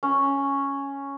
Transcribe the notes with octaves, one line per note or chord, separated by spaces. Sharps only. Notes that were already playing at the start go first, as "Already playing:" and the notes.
C#4